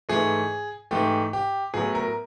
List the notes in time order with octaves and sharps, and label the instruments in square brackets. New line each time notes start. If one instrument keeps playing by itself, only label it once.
[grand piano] G#2 E3 A3 G#4
G#2 E3 A3 G4
G4
A2 F#3 B3 G#4
A#4